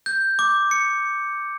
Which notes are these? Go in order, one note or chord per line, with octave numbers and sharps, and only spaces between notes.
G6
D6
C#7